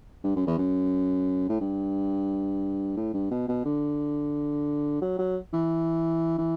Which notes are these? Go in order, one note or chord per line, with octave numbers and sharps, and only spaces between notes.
G2
F#2
E2
F#2
A2
G2
A2
G2
B2
B2
D3
F#3
F#3
E3
E3